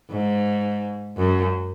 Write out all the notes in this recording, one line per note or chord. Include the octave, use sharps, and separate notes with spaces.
G#2
F#2